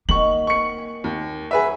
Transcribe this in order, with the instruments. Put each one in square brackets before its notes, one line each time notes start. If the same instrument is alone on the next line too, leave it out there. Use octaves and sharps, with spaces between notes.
[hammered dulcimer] D#3 D#5 F#5 [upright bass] A#3 [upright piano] C#6 F#7
[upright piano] C#6 C#7
[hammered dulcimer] G#5
[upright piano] D#2
[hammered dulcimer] F#3 [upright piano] G#4 B4 E5